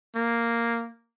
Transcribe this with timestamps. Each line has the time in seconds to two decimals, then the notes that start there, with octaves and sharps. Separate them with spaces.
0.15 A#3